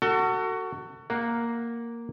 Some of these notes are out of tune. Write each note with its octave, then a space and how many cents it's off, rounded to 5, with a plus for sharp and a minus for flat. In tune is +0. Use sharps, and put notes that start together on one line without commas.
F#4 +15 A4 +35
A#3 +0 F#5 +0